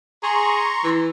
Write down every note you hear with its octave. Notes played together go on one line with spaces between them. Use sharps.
G#4 A#5 C6 C#6
E3